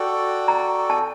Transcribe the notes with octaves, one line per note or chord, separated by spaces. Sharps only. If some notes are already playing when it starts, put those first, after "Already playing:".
Already playing: F#4 A4 D5 G5
A#5
A5